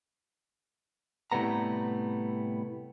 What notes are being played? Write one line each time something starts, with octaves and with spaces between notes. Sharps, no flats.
A2 C3 G3 B3 A#5